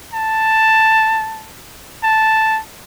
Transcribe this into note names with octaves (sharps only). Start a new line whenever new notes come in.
A5
A5